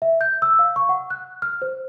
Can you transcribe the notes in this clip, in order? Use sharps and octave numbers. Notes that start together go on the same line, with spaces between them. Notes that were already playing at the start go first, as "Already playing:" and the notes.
E5
G6
E6
F5
C#6
F#5
F#6
F6
C5